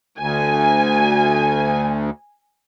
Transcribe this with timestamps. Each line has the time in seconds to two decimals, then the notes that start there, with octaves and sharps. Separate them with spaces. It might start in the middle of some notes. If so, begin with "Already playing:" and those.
0.18 D2 G#5